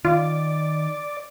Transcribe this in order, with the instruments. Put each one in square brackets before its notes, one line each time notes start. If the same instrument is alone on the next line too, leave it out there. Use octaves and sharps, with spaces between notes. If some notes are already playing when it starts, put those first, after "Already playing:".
[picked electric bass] D#3 [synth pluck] F4 [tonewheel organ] D5